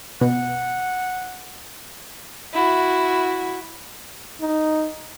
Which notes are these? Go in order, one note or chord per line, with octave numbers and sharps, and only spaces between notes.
B2 F#5
E4 F#4
D#4